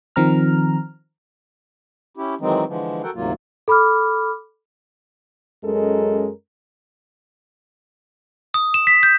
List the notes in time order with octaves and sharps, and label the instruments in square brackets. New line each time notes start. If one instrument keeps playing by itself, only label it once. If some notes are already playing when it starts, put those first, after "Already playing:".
[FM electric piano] D#3 F3 C4 A#5 F6
[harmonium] C#4 E4 G4
D#3 E3 F#3 G#3 C4 D#4
D3 E3 F3 G#3
F#4 A4 A#4 F#5 G5
D2 G#2 C3 F#3 A#3 F4
[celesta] A4 B5 D6 F6
[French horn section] F#2 G#3 C#4 A4 A#4 D#5
[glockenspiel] D#6
E7
B6
G6